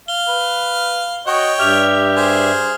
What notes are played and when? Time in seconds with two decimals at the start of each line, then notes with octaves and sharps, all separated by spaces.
0.08 F5 G7
0.28 B4
1.27 F#4 C#5 D#5 G5
1.59 G2 G4 E5 F6 F7
2.16 G#4 C5